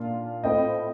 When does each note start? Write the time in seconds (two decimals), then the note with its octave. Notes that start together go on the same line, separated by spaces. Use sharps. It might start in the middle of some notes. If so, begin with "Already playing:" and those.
Already playing: A#2 D4 F4 F5
0.44 A2 A3 C4 F4 D#5 G5